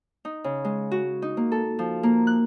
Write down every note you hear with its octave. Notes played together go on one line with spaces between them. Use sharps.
D#4
C#3
G#3
F#4
D#4
A#3
A4
F3
A#3
F#6